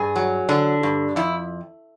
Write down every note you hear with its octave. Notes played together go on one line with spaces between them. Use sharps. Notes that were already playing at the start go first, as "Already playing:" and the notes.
Already playing: G2 G#4
F#3
D3 D4
G2
F2 E4